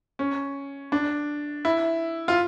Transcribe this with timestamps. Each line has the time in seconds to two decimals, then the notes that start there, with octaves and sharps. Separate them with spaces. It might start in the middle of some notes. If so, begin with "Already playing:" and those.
0.19 C#4
0.92 D4
1.65 E4
2.28 F4